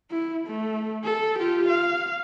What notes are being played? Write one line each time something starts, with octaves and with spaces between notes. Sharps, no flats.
E4
A3
A4
F4 G4
F5